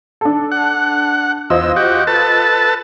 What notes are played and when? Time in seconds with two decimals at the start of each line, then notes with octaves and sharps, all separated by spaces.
0.21 D4 A4
0.52 F#5
1.50 E2 F4 C5 D#5 E6
1.76 F#4 G4
2.07 A4 B4 A5